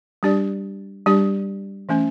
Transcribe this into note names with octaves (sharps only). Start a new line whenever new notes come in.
G3 D4 G4 D5
G3 D4 G4 D5
E3 A3 C#4